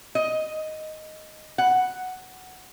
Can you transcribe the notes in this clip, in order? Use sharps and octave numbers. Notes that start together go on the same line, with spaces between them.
D#5
F#5